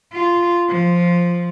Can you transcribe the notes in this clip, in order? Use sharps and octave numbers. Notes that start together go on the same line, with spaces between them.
F4
F3